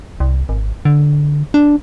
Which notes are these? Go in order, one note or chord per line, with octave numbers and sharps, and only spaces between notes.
C2
G#1
D3
D4